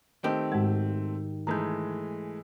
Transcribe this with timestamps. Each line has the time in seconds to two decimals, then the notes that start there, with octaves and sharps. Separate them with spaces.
0.24 D#3 A3 C4 G4
0.52 G#2 G#3
1.47 E3 G#3 A3 A#5 G6